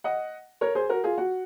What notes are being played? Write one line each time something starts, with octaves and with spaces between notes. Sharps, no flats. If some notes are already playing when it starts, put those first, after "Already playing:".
D#5 F#5
A#4 C#5
G#4 C5
F#4 A#4
F4 G#4
F#4